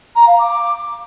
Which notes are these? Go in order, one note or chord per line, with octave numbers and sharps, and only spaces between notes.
A#5
F5
D6